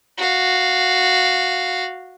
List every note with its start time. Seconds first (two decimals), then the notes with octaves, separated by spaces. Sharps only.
0.18 F#4 F5